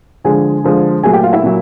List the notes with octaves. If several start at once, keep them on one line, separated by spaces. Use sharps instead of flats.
D3 F3 G#3 G#4 G#5
D3 F3 G#3
A#2 F#3 A3 G#4 G#5
G4 G5
F4 F5
E4 E5
A#2 F#3